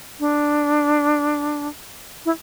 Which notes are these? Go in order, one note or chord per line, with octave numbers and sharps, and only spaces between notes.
D4
E4